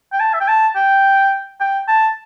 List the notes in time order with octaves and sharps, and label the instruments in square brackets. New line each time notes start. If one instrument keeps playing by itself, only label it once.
[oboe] G5
A5
E5
G5
A5
G5
G5
A5